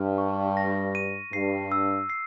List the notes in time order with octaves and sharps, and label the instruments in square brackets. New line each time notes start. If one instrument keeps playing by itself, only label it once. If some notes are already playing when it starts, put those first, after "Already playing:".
Already playing: [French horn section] G2 [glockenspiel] F6
[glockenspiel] C#6
A#6
D#7
[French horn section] G2 [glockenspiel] C7
[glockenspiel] E6
C7